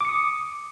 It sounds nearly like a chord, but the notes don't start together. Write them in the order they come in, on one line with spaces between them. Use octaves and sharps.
D6 C#7 D#6